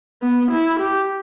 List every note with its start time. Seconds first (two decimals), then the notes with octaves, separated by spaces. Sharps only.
0.22 B3
0.51 E4
0.80 G4